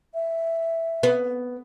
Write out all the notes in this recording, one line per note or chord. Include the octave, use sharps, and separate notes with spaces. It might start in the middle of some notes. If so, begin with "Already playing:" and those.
E5
B3